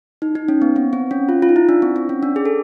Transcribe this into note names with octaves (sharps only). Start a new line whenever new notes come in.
D#4
D#4
C#4
B3
C4
C4
C#4
F4
F4
D#4
E4
D4
C4
C4
C#4
D4
G#4
A4